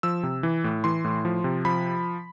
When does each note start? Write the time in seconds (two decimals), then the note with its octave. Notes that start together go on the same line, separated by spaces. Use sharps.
0.03 F3 E6
0.23 C3
0.43 E3
0.64 A2
0.84 E3 C6
1.04 A2
1.25 F3
1.44 C3
1.65 F3 B5